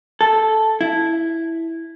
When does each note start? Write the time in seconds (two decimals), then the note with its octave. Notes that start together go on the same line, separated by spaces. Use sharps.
0.21 A4
0.81 E4